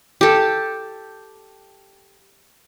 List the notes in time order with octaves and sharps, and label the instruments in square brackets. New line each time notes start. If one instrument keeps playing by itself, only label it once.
[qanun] G4 A4